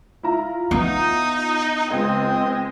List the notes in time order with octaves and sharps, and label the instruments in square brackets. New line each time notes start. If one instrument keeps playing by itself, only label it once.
[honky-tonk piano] E4 F4 A#5
[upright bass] B3 [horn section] D#4
[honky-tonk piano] C#2 [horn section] G#3 D#5 [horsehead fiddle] C4